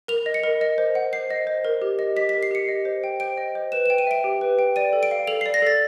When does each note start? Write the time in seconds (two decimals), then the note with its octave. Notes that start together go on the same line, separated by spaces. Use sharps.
0.08 A#4 F7
0.26 D#5
0.34 C#7
0.43 A#4
0.61 D#5
0.78 C5
0.95 F#5
1.13 C5 C7
1.31 D#5
1.47 C5
1.65 A#4
1.82 G4
1.99 D#5
2.16 G4 B6
2.29 B6
2.34 A#4
2.43 C7
2.51 G4 C#7
2.68 D#5
2.85 C5
3.04 G5
3.20 C5 D7
3.38 D#5
3.55 C5
3.72 B4 E7
3.86 E7
3.90 G5
3.98 D#7
4.07 E5 D7
4.24 G4
4.41 B4
4.59 G5
4.76 D5 D#7
4.93 A4
5.03 D7
5.11 F5
5.27 A4 F7
5.41 C7
5.46 D5
5.54 A#6
5.62 A4 A6